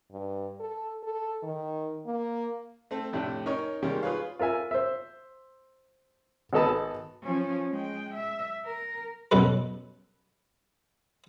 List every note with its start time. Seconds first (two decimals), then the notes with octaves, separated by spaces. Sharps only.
0.12 G2
0.60 A4
1.03 A4
1.43 D#3
2.07 A#3
2.91 A3 C4 A4
3.13 F2 A2 C3 A3 D4
3.46 C#4 D#4 A#4 C#5
3.82 C3 D#3 G3 G#3 A#3 C#4
4.03 F4 G#4 B4 C#5 F5
4.39 F4 A#4 E5 G#5
4.71 C5 E5
6.53 G#1 B3 A4 D#5 A5 B5
7.23 F3 C#4
7.71 G#3 G5
8.14 E5
8.65 A#4
9.31 F#2 B2 A4 B4